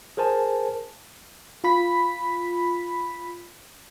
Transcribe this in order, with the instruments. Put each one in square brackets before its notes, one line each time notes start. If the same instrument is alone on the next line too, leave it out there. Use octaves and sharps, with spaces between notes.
[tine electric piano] G#4 A#4 C5 G#5 A5
[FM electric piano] F4 B5 B6